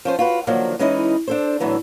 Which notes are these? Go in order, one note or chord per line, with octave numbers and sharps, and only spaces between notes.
F3 C#4 C5
F4 F#4 B4
D3 D#3 F3 F#3 A#3
E3 G#3 C#4 D#4 E4 D#5
D4 A4 C5
A2 D3 E3 F#3 B3